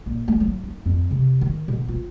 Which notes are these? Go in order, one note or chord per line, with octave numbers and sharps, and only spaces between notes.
A#1
A3
F#3
D#4
F2
C3
D#3
B2
F4